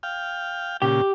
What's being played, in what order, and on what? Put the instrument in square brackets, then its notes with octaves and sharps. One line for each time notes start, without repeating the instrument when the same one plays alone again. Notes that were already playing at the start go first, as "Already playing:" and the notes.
[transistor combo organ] F5 G5
[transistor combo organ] A#2 C#3 [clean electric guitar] G4